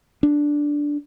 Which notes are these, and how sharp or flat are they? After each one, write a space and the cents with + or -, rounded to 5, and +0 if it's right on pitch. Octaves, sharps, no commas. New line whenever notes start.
D4 -5